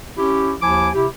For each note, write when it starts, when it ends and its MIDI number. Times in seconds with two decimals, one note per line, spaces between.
0.18 0.53 61
0.18 0.53 64
0.18 0.53 67
0.61 0.89 39
0.61 0.89 53
0.61 0.89 64
0.61 0.89 80
0.61 0.89 86
0.95 1.07 48
0.95 1.07 64
0.95 1.07 67